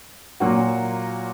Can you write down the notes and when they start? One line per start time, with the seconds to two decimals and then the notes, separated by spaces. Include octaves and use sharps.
0.40 A#2 F#3 A#3 F#4